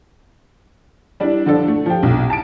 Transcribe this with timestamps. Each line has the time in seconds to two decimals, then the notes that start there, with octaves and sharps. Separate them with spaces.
1.20 G3 D4 E4
1.46 D3 F3 D4 A4
1.68 A3
1.86 F3 G4
2.03 B1
2.30 A5 D7